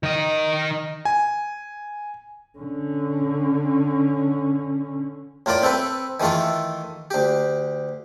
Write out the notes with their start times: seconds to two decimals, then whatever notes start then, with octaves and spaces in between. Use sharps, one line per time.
0.03 D#3 D#5
1.05 G#5
2.58 D3 C#4
5.46 A2 F4 A#4 D5
5.63 C4 A4 B4
6.20 D#3 E3 A3 F4 A4
7.11 D2 G4